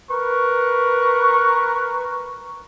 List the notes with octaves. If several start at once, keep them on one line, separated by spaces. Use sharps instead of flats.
A#4 B4 C#6